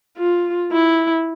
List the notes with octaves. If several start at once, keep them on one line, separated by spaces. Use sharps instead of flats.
F4
E4